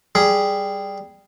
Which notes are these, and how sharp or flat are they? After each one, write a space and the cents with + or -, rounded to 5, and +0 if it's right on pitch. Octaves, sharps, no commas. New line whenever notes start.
G3 +5 G#4 +0